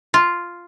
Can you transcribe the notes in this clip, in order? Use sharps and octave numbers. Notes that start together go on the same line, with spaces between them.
F4